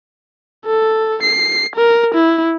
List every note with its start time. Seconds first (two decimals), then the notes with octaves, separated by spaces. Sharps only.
0.66 A4
1.23 C7
1.76 A#4
2.14 E4